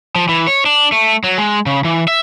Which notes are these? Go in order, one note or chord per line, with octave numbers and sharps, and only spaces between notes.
F3
E3
C#5
D4
A3
F#3
G#3
C#3
E3
E5